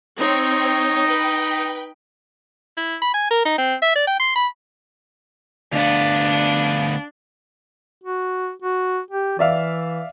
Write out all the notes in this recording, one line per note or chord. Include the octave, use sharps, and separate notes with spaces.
C4 D#4 C#5 G5
B4 G5
E4
B5
G#5
A#4
D#4
C4
E5
D5
G5
C6
B5
D2 B3 D4 F5
F#4
F#4
G4
E3 D5 E5 F5